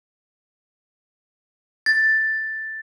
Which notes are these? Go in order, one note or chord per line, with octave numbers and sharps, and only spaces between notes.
A6